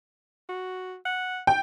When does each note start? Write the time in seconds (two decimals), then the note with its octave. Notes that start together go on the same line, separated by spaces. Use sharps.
0.49 F#4
1.06 F#5
1.47 G5